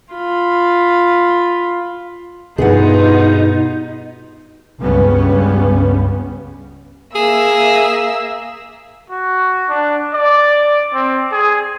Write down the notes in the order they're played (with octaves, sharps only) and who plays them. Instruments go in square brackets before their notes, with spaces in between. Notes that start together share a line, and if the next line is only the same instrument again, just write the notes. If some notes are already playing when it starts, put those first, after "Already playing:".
[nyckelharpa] F4 B5
[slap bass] G2 B2 [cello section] B3 F4 [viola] D#4 [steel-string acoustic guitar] G#4 B4 F#5
[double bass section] C#2 G2 C#3 G3 B3 C#4
[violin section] A#3 E5 E6 [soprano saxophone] G#4
[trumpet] F#4
D4
D5
C4
G#4